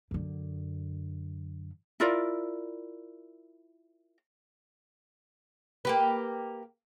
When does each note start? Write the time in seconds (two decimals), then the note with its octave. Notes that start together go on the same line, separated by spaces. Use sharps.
0.11 F#2 D3
2.00 E4 F4 A#4 D5
5.85 A#3 G4 B4